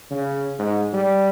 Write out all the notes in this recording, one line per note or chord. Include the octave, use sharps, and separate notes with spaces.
C#3
G#2
G3